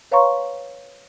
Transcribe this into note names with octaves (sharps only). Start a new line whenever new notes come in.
B4 C#5 F5 A#5 C6 C#6